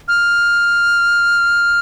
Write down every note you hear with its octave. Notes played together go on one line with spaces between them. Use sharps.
F6